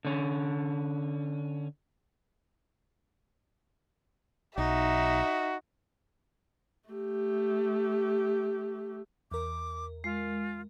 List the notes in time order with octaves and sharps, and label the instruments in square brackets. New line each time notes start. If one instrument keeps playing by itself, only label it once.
[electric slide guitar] D3 C#4
[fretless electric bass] B1 [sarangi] D#4 [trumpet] F#4 [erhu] E5
[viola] A3 G4
[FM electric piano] E2 A#4 [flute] D6
[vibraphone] G#3 [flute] F4